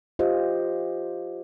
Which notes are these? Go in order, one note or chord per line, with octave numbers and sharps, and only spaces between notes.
F4 G4 C5 D#5